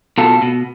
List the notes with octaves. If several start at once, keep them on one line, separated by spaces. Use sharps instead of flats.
B2 F4 A4
B2